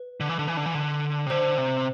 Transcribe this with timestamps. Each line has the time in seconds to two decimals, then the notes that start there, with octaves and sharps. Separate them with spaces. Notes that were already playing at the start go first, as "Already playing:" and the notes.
Already playing: B4
0.20 D3
0.29 E3
0.39 D3
0.48 E3
0.57 D3
0.66 E3
0.74 D3
1.27 C3
1.30 D3 C5
1.58 C3